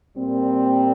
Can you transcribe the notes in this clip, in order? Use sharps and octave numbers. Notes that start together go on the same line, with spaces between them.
A#2 G3 A#3 C4